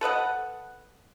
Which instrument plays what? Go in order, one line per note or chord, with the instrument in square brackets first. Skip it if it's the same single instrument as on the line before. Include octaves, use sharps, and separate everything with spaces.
[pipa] A4 B4 D#5 F#5